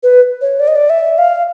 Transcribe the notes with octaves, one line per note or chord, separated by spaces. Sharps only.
B4
C#5
D5
D#5
D5
E5
F5